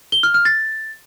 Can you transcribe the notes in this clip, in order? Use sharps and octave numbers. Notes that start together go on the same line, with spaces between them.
G7
F6
F6
A6